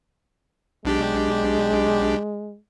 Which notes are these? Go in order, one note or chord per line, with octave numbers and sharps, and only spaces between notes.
B1 G#3 D4 G4